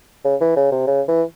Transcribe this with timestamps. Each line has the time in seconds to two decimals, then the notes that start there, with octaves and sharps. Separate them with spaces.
0.25 C#3
0.41 E3
0.56 C#3
0.72 C3
0.87 C#3
1.08 E3